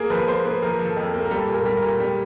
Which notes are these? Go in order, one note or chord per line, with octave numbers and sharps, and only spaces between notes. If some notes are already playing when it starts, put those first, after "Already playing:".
Already playing: A#3 G#4
F3 B4
A#3 C5
A#3 B4
F3 A#4
F3
A4
F2
A#3
A#4
G3 A4
A#2
A#4
G3
A#4
A#2
G3